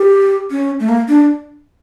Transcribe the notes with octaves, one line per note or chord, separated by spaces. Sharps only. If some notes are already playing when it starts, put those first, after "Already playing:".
Already playing: G4
C#4
A3
A#3
D4